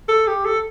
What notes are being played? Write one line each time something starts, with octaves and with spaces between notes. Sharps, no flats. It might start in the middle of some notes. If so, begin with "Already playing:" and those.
A4
G4
A4